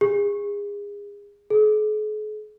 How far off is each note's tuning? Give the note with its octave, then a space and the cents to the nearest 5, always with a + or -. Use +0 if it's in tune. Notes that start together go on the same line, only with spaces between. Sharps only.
G#4 -30
G#4 +45